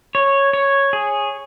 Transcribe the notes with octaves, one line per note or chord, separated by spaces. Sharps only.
C#5
C#5
G#4